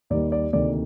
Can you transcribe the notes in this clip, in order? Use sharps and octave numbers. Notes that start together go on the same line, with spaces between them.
D#2 D#3 G3 A#3 D5
D5
D2 C3 D#3 A#3 D5